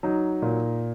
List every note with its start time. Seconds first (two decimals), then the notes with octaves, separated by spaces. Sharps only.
0.03 F#3 D#4
0.42 A#2